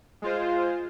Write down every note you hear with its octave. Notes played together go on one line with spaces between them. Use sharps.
G#3 F4 C5